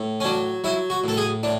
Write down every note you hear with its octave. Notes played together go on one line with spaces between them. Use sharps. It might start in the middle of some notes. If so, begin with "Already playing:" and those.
Already playing: A2
C#4
F#3 D4
F#3 E4
F#4
A2 A4
G#4
A2 D4